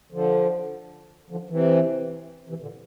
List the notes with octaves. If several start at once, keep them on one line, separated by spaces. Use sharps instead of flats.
D3 F3
D3 F3
C3 E3
C3 E3
A#2 D3